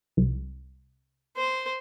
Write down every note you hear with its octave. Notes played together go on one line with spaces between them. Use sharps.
C2
C5